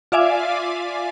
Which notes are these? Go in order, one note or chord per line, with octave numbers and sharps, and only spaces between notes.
F4 D5 E5 F5 G#5 D6